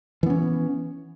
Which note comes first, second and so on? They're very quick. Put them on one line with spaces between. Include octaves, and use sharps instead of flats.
E3 B3 C#4